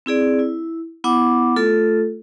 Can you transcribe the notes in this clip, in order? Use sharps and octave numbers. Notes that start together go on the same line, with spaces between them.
C4 E4 G#4 D5
E4
B3 E4 F#5 D6
A3 F4 A4